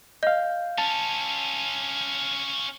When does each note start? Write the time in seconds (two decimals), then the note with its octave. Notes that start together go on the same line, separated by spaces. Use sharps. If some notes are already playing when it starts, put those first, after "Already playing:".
0.23 D#5 F5 G6
0.78 C#4 F4 A5